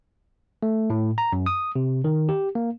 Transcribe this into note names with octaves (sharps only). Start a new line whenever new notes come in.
A3
A2
A#5
F#2
D#6
C3
D#3
G4
A#3